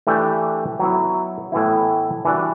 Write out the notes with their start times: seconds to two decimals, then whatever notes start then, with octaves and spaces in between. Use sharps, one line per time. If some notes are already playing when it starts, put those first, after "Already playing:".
0.07 E3 A3 D4 G4
0.79 F#3 B3 E4
1.52 A2 E3 B3 E4
2.25 E3 G3 D4 F#4